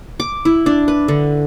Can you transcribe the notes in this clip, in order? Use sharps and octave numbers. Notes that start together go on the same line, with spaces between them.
D6
E4
D4
B4
D3